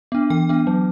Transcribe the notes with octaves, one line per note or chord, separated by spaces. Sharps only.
B3 D4
E3 G5
B3 D4
F#3